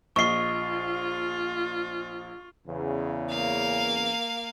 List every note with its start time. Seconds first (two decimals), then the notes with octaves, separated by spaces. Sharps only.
0.16 A#1 F4 D#5 C#6 C7 G7
2.68 E2 C#3
3.31 A#3 F5